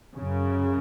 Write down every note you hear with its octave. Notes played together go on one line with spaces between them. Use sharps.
F#2 C#3